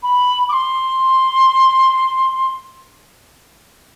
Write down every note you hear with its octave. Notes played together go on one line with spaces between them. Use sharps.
B5
D6
C6